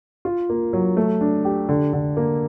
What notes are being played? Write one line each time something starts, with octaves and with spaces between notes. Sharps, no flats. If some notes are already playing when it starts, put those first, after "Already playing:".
F4
A#3
F#3
A3
D4
G4
D3
D3
A#3